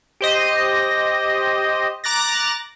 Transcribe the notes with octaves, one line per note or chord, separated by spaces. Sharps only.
G4 C5 D#5
A#5 D6 F#6 A6 A#6